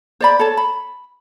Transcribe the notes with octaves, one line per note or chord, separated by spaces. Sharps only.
C5 D5 B5
A4 C#5 A5
B5